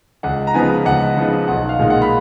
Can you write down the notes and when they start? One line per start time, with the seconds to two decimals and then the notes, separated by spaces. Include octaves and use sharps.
0.23 C#2 F#5
0.47 A#5
0.54 C#3 F3 B3 D#4 G#5
0.85 C#2 F#5
1.17 C#3 F3 B3 D#4
1.48 B1 F#5
1.69 F5
1.79 A#2 G#3 D#4
1.90 F#5
2.02 B5